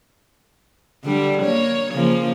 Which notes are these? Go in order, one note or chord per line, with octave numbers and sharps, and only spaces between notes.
D3 G3
A#3 C#5
C#3 F3 A#3